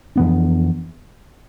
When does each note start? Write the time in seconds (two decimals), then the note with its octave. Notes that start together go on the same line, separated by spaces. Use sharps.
0.16 F2 E3 B3 D4